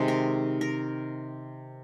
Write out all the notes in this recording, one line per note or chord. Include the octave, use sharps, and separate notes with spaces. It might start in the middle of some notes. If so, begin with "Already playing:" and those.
Already playing: C3 D#3 G#3
A#4
A#4